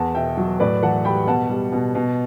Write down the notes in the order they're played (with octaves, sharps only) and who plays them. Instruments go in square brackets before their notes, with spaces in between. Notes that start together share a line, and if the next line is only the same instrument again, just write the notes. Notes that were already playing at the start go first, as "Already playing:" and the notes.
Already playing: [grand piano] E2 F#5 A5
B2 E5 G5
F#3
A2 B4 D5
E3 F#5 A5
G3 G5 B5
B2 F#5 A5
G3
B2
B2